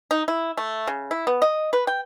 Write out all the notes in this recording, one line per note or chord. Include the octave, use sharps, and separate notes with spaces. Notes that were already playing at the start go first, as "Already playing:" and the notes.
D#4
E4
A3
C#3
E4
B3
D#5
B4
G5